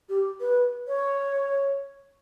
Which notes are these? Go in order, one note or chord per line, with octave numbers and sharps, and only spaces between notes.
G4
B4
C#5